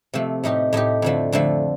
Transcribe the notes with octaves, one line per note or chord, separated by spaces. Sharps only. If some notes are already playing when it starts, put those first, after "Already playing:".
C3 F3 A3
A2 A3 D#4 G4
A2 A3 D#4 G4
F2 D3 F3 A3
F2 D3 F3 A3